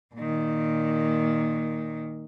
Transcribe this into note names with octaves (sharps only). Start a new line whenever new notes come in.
A#2 D#3